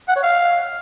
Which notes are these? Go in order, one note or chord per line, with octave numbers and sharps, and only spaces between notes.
F#5
C#5
F5